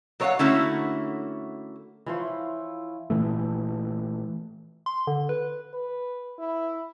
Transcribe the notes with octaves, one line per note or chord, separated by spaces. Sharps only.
F#3 A#4 C#5 D#5 F5 F#5
D3 A3 A#3 C#4 E4 F#4
E3 F3 E4 F4 C5 C#5
A#2 E3 A3
C6
D3
B4
B4
E4